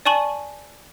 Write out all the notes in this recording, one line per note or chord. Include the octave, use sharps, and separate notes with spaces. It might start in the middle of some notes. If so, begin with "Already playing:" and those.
D5 G#5 A5 C#6 D#7 F#7